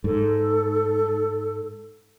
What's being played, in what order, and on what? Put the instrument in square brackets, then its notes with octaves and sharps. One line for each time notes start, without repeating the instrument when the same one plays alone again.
[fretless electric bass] G#2 [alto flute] A4